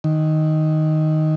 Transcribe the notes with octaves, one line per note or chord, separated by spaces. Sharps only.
D#3